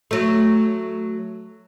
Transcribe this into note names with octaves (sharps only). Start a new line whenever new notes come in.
F#3 A3